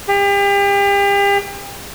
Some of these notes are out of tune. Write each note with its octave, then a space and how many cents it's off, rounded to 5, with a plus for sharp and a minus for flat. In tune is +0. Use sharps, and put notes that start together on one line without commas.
G4 +40